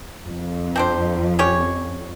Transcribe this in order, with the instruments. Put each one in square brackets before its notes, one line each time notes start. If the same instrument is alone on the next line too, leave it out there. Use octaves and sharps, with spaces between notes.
[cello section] F2
[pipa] C4 D4 C5
C#4 G4 C#5